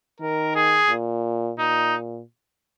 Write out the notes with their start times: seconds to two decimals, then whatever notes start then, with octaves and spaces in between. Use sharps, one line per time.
0.20 D#3 A#4
0.55 G#4
0.89 A#2
1.59 A#2 D#4